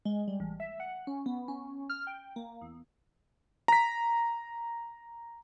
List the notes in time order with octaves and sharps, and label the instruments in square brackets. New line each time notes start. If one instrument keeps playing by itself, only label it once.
[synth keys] G#3
G3
A1
E5
F#5
C#4
B3
C#4
F6
G5
A#3
E2
[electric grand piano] A#5 B6